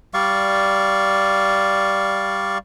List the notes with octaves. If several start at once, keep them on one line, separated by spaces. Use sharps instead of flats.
G3 D5 F5 C#6